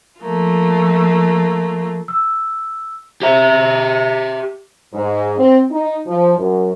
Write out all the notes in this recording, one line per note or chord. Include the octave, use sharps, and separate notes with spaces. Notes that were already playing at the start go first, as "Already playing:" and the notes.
F3 A3 A#3 F4
E6
G4 E5
G#2
C4
D#4
F3
F#2